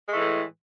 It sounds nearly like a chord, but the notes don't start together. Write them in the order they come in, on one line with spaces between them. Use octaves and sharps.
G#3 A3 E3 A2